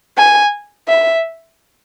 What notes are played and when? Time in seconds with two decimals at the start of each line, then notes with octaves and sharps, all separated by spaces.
0.18 G#5
0.88 E5